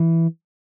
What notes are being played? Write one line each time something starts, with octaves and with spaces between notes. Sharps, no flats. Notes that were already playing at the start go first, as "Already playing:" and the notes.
Already playing: E3